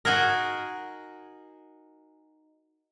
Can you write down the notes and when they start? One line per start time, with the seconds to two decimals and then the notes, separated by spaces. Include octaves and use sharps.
0.05 D#4 F#4 G#4 A#4